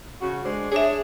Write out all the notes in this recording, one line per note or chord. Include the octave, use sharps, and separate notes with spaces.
C#3 F#4
G#3 D4 C5
D4 G#4 C#5 E5